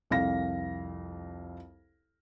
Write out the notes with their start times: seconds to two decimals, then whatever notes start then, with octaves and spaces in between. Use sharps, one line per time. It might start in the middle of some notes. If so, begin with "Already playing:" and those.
0.10 C2 F2 F5 A#6